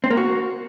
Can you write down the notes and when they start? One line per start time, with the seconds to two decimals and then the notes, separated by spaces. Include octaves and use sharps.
0.04 C4
0.10 A#3
0.17 F#4